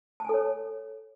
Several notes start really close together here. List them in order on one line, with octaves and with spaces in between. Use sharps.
A5 G#5 A4 C#5